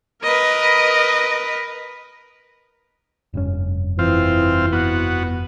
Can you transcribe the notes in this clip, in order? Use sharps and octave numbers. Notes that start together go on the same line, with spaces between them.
A#4 B4 D#5
F1 G2 C#4
E3 C4 F4
B3 F#4